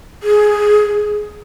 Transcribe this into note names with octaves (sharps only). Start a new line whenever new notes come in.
G#4